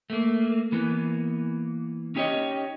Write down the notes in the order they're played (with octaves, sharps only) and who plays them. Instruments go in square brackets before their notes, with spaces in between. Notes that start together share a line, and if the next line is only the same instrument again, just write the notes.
[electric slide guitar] A3 A#3
E3 A#3 B3
C#4 D#4 G4 G#4 C#5 D#5